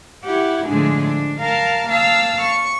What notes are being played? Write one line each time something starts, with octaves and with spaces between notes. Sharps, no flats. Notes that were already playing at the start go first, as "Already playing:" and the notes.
E4 G4 F#5
A2 D3 F3 G#3 D4 G#4
D4
A#4 F5 A5 A#5
A#3 F5 A5 E6
C#6